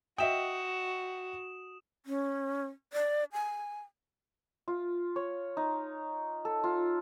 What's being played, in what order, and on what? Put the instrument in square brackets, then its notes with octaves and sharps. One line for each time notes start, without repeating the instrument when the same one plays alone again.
[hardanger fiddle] F#4 [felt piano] D#5 E5 G5 [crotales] D#6 E7
[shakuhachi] C#4
D5
G#5
[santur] F4
C#5
D#4
A4
F4